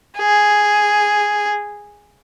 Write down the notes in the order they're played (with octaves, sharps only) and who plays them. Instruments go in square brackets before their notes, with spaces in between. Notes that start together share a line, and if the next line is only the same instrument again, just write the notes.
[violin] G#4